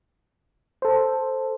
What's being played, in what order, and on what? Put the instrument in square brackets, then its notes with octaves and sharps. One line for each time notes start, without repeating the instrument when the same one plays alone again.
[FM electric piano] A4 C5